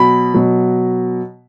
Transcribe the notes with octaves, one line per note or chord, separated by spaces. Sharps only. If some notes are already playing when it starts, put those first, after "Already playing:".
Already playing: B2 F#3 B5
B2 F#3